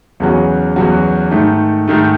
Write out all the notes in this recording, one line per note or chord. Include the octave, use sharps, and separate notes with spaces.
E2 C#3 F#3 C#4 F#4
E2 C#3 F#3 C#4 F#4
G#2 D#3 A3
G#2 D#3 A3